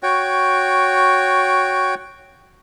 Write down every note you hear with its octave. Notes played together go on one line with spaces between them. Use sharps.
F#4 C#5 G5